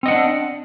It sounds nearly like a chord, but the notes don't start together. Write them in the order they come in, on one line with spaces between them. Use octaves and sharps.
C4 D#5 F#5 D4